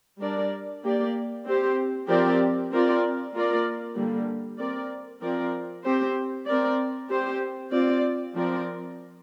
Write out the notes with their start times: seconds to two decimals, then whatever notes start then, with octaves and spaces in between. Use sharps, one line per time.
0.20 G3 D4 A#4 D5
0.83 A#3 G4 D5
1.45 C4 G4 C5
2.08 F3 C4 G4 A#4 D5
2.71 C4 F4 A#4 D5
3.34 A#3 F4 A#4 D5
3.96 D3 G3 A#3
4.58 C4 A#4 D5
5.21 F3 C4 A#4 D5
5.84 C4 G4 C5
6.47 C4 A#4 D5
7.10 C4 G4 C5
7.71 C4 F4 D5
8.34 F3 C4 A#4 D5